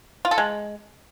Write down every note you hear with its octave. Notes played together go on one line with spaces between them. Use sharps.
F4
A4
G#3